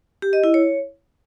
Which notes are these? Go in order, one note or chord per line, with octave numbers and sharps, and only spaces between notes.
G4
D#5
E4
C#5